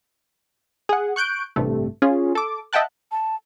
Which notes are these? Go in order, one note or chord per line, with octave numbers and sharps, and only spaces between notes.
G#4 F#5
C#6 F#6 G6 D7
A1 G2 C3 A3
C#4 F4 G#4
A4 D6
D#5 E5 F#5 G5 A5 F#6
A5